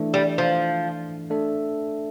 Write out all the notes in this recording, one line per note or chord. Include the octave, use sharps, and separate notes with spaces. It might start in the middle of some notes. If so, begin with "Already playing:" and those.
Already playing: E3 A3 D4
G3
F3
A3 D4 A4 E5